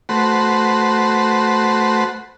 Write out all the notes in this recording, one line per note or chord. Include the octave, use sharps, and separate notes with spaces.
A3 F#4 B4 C5